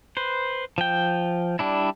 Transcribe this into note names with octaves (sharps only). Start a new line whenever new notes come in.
B4 C5
F3 G5
G3 D4 E4